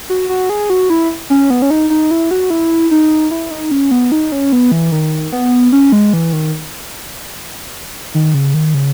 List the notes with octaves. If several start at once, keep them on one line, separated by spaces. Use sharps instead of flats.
F#4
F#4
G#4
F#4
E4
C#4
B3
C#4
D#4
D#4
E4
F#4
E4
D#4
E4
D#4
C#4
B3
D#4
C#4
B3
E3
D#3
B3
C#4
G#3
E3
D#3
D#3
C#3
D#3
C#3